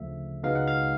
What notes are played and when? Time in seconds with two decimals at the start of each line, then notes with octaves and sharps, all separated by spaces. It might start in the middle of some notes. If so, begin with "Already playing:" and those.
Already playing: D2 C#3 F3 A3 E5
0.43 C#2 B2 G#3 B3 D#4 F5
0.55 F#5
0.67 F5